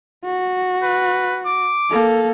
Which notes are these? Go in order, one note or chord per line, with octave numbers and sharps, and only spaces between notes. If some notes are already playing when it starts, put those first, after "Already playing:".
F#4
B4
D6
A#3 A4